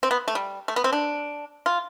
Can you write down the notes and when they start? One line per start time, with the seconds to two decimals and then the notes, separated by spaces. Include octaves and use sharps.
0.03 C4
0.11 B3
0.28 A3
0.35 G3
0.68 A3
0.76 B3
0.84 C4
0.93 D4
1.66 F4